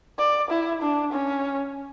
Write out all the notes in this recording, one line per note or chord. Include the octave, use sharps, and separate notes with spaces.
D5
E4
D4
C#4